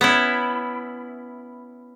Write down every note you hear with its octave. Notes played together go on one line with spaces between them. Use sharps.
B3 C#4 E4